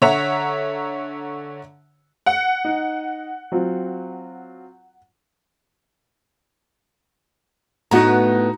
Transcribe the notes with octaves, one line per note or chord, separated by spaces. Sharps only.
D3 C#5 E5 F#5 A#5 F7
F#5
D#4
F#3 C4 F4
A2 B3 D#4 F#4 A#5